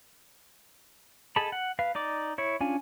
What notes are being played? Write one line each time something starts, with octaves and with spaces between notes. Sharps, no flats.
G#4 A4 D#5 A5 B5
F#5
B4 F5
D#4 D5 D6
E4 C#5
C#4 D4 F4 G#5